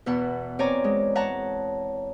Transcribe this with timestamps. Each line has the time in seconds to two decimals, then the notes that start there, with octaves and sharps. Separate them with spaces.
0.06 E2 B2 F#5
0.59 C4 C#5 D5 G#5 A#5
0.84 G#3
1.15 C#5 F#5 A5 A#5